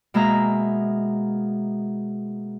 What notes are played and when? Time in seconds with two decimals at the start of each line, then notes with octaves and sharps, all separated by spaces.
0.14 B2 G#3 A#3 E5 A#5